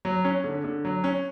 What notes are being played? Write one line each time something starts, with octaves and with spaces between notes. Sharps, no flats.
F#3
C#4
D3
D3
F#3
C#4